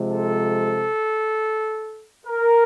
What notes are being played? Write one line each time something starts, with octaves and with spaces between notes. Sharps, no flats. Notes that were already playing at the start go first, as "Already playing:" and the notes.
Already playing: C3 F3 G#3
A4
A#4